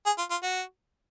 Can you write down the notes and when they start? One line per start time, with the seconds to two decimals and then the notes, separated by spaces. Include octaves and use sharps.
0.06 G#4
0.18 F4
0.31 F4
0.43 F#4